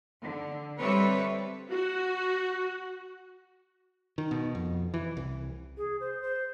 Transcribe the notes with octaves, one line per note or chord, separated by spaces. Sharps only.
D3
G3 C4 A4 B4 C#5 E5
F#4
D#3
B2
F2
E3
C2
G#4
C5
C5